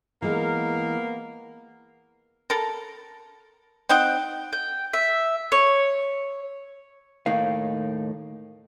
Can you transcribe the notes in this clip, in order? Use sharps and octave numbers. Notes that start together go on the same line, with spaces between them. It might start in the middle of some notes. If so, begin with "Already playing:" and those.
E3 G#3 A#3 B3 A#4
A4 A#4
C4 D#4 F#5 G5
G5
E5
C#5
D#2 A2 D#3 F5